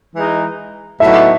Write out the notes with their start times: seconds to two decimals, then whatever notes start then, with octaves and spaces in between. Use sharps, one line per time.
0.14 E3 G#3 D#4
1.00 A2 F#3 B3 D#4 F#4 E5